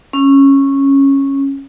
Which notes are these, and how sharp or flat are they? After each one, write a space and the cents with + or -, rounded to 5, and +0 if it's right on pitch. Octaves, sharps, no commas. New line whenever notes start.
C#4 -10